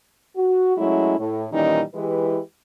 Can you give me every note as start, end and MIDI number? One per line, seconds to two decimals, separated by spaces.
0.37 0.75 66
0.77 1.19 54
0.77 1.19 56
0.77 1.19 57
0.77 1.19 61
0.77 1.19 64
1.19 1.46 45
1.52 1.81 46
1.52 1.81 51
1.52 1.81 52
1.52 1.81 55
1.52 1.81 61
1.52 1.81 63
1.95 2.39 52
1.95 2.39 56
1.95 2.39 64
1.95 2.39 67
1.95 2.39 71